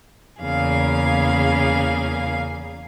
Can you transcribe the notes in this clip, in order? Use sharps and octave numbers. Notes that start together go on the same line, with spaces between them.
E2 C#3 A#3 G#4 F5